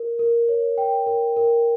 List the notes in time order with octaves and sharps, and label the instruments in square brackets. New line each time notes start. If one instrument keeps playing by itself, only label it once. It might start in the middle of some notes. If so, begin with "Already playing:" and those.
Already playing: [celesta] A#4
A#4
C#5
G5
A#4
A#4